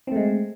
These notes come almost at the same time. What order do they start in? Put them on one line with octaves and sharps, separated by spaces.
C4 A3 G#3